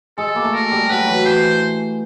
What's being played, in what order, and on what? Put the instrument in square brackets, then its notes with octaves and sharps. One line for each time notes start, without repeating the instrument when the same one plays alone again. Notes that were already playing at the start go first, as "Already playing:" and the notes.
[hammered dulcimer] G#3 [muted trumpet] A4
[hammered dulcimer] A#3
A3
[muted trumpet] A#4
[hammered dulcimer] G3
[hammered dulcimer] F#3 [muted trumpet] B4
[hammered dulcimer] E3
[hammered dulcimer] E3 [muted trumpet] C5